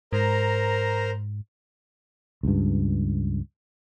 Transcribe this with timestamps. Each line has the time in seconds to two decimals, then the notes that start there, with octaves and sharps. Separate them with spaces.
0.13 G#2 A#4 C5 A#5
2.43 C#2 G2